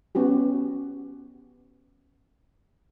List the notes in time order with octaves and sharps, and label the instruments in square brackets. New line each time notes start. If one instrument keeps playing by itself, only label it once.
[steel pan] B3 C#4 F#4 G4